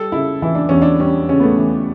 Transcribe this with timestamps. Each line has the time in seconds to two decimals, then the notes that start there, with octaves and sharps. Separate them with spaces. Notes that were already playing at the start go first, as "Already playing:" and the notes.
Already playing: G3 A4
0.12 C#3 E4
0.42 E3 E4
0.55 D4
0.69 E2 C#4
0.82 D4
1.00 G3 C#4
1.29 C#3 C#4
1.40 B3
1.43 A3
1.58 E3